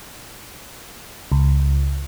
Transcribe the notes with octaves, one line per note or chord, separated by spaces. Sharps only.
C#2